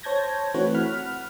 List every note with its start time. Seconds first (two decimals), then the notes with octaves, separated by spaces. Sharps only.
0.03 C5 C#5 A5 G6 G#6 A#6
0.54 E3 A3 C4 F#4 B4 C#5
0.74 F#5 B5 F6